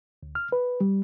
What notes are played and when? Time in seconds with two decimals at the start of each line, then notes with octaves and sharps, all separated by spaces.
0.23 D2
0.35 F6
0.52 B4
0.81 G3